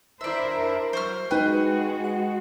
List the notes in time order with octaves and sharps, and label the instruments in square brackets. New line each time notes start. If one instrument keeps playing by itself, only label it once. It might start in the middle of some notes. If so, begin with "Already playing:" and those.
[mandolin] D4 E5 [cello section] E4 A#4 C5
[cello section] F#3 [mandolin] C5 C#6 F6
[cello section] G#3 F#4 [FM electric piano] D#4 G5 [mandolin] B4
[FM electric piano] F#5